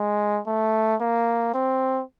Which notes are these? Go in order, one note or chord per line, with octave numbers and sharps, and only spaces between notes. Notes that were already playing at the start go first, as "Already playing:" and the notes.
Already playing: G#3
A3
A#3
C4